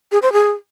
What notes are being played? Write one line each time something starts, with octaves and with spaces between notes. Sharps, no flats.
G#4
C5
G#4